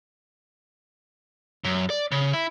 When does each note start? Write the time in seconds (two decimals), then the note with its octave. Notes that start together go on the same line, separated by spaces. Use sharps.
1.64 F#2
1.90 D5
2.12 C#3
2.33 E4